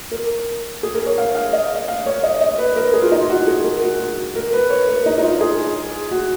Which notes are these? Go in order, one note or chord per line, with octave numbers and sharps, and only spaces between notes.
A#4
G#4
A#4
C#5
F5
F5
D#5
F5
C#5
D#5
D#5
B4
A#4
G#4
F4
D#4
F4
F#4
G#4
A#4
F#4
F#4
A#4
B4
C#5
A#4
D#4
D#4
F4
G#4
F#4